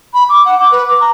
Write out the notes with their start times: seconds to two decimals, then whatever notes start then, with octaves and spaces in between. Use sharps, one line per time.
0.13 B5
0.28 D6
0.45 F#5
0.58 D6
0.71 B4
0.88 D6
1.00 A#5